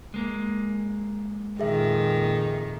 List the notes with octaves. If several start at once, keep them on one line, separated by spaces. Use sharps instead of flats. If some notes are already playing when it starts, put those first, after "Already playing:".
G#3 A#3
F2 A#2 D#3 G#4 E5